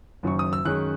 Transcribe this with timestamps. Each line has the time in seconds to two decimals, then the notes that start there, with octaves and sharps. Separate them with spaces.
0.23 F#1 F#2 D#3 F#3 C#6
0.39 D#6
0.53 E6
0.65 F#2 D#3 G#3 C#4 F#6